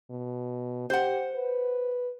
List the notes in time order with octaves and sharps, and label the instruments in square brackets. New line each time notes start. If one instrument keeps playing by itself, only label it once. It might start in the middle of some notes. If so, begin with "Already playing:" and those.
[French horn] B2
[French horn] G4 [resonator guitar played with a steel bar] C5 F#5
[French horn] B4